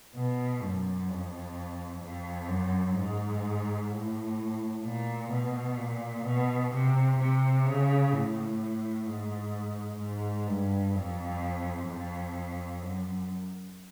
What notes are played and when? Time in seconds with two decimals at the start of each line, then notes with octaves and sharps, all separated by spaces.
0.15 B2
0.62 F#2
1.09 F2
2.03 F2
2.49 F#2
2.97 G#2
3.91 A2
4.84 A#2
5.31 B2
5.78 A#2
6.26 B2
6.73 C3
7.19 C3
7.65 C#3
8.13 A2
9.07 G#2
10.00 G#2
10.47 G2
10.95 F2
11.88 F2
12.82 F#2